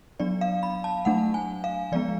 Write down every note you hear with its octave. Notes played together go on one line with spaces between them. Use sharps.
F#3 B3 D4 D5
F5
B5
A5
F#3 A3 D4 F#5
G#5
F5
F3 G#3 B3 D5